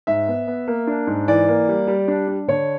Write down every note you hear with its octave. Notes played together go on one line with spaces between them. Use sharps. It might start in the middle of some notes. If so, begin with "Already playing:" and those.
G#2 E5
B3
B3
A#3
D4
G#2
E3 D5
A#3
G3
G3
D4
D4
D3 C#5